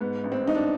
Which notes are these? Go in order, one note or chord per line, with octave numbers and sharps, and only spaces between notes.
G#2 B3
A1
C4
A1 D#4
D4